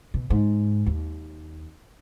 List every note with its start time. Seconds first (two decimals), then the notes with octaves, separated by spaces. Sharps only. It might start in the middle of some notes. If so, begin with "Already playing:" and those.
0.14 B2
0.30 G#2
0.86 D#2